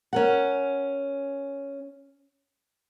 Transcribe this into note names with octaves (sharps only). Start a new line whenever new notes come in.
C#4 A#4 F#5